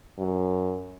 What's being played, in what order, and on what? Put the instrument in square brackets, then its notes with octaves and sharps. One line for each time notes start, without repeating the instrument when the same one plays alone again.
[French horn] F#2